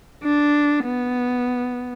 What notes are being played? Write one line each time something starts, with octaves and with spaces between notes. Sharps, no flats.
D4
B3